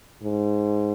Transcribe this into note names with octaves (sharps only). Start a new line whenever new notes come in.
G#2